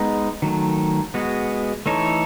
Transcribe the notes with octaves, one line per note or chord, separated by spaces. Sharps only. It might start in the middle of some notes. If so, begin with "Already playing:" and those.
Already playing: G#3 B3 D#4
D#3 F#3 A3
G#3 B3 F#4
E3 A3 D#4 A4 C#5